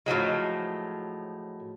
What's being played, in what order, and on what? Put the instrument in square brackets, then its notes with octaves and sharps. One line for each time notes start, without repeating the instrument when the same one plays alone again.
[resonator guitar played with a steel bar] A2 F3 F#3 G#3